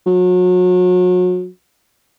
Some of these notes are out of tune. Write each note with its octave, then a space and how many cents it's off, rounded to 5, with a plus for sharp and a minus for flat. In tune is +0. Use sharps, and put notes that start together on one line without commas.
F#3 -35